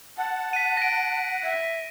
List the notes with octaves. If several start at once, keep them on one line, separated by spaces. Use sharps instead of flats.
F#5 A5
B6 D#7
A#6 D7
E5